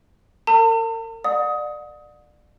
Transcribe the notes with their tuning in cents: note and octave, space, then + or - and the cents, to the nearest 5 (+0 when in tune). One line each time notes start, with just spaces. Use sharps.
A#4 -40 A5 +45
D5 +25 F#5 -40 D#6 +20